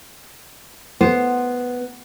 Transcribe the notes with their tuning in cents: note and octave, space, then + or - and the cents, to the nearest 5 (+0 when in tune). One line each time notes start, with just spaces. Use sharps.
B3 +0 C5 +0